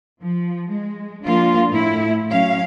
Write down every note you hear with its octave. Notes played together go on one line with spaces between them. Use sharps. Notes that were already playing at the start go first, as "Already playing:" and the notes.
F3
G#3
F3 A#3 D4 F4
A2 E4
F#3 C#4 F5